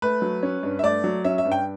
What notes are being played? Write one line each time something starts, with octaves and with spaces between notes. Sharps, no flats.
A3 B4
F#3
C#4
G2
E5
A3 D5
F#3
C#4 E5
E5
G2
G5